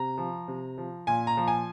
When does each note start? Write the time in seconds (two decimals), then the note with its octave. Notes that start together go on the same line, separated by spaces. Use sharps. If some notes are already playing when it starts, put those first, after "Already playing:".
Already playing: C3 A#5
0.18 F3
0.48 C3
0.78 F3
1.07 A#2 G#5
1.27 A#5
1.37 F3
1.48 G#5